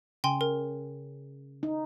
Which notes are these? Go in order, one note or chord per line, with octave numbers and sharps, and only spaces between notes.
C#3 G5 G#5 C6
A#4
D#4